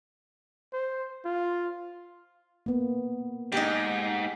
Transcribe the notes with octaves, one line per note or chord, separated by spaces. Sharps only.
C5
F4
A#3 B3
G#2 D#4 G4